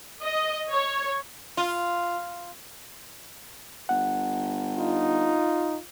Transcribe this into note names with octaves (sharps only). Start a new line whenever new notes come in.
D#5
C#5
F4
G1 F#5
D#4 F4